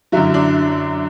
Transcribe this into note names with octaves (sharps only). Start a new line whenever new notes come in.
F#2 D3 F#3 E4
D4